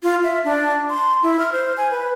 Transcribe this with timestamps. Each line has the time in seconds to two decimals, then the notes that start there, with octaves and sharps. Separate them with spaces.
0.03 F4
0.23 E5
0.44 D4
0.90 C6
1.23 E4
1.39 F6
1.52 C5
1.77 G#5
1.91 B4